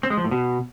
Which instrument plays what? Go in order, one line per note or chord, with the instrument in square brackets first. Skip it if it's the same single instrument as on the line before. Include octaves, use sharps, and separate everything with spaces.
[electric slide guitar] C4
G#3
F3
A2
B2